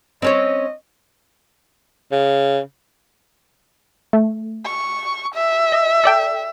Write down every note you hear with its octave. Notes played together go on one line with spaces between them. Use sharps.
C4 C#4 C#5 D#5
C#3
A3
C#6
E5
D#5
A4 D5 G5